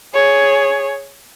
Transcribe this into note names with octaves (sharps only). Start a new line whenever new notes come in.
G#4 C#5